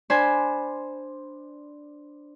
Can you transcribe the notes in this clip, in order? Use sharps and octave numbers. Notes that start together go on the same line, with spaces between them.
D4 C5 G#5 A5 B5